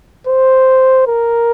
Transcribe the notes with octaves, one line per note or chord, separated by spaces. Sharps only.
C5
A#4